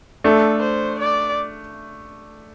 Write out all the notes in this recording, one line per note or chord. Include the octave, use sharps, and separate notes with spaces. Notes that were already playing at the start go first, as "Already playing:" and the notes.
A3 D4 A4
C5
D5